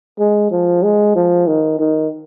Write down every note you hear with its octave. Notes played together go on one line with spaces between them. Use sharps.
G#3
F3
G#3
F3
D#3
D#3